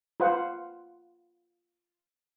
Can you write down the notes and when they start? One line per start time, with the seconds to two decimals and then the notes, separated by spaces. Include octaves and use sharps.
0.20 F4 B4 C5 F#5